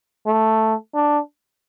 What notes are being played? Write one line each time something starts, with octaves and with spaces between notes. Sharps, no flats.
A3
D4